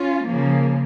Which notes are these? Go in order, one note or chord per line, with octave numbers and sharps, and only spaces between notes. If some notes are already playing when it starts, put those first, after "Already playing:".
Already playing: C#4 F4
C#3 F3 A#3